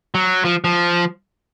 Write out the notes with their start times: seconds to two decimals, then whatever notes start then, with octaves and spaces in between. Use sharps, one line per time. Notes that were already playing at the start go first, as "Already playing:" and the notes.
0.15 F#3
0.45 F3
0.64 F3